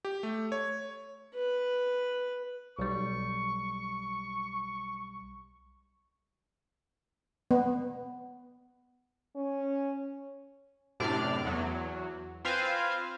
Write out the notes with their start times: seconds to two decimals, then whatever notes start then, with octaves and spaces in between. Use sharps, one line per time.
0.05 G4
0.23 A3
0.52 C#5
1.35 B4
2.79 B1 G3 C#6
7.51 B3
9.36 C#4
11.00 F#2 A2 C3 D4 D5 F6
11.45 E2 F#3
12.45 C4 F4 B4 C5 F5 G#5